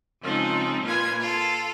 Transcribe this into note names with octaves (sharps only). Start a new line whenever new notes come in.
C#3 F3 G#3 C4 D#4
A#2 A#3 F4 B4 G#5 G#6
F4 A4